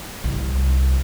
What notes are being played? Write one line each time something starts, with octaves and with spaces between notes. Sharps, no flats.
C2